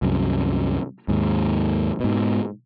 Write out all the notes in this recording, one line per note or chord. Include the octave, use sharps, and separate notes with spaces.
C2 F#2
D#2 G#2
G#2 B2